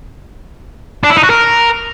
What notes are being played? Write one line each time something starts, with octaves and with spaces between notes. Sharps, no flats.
D4
E4
D#4
F#4
A#4